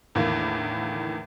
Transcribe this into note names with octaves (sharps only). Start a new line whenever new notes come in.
E2 A2 D3 D#3 A#3